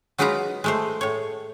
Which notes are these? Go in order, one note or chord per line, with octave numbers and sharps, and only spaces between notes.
F#3 G#3 D#4 F4 B4 A#5
G#3 A3 C5
A2 C#5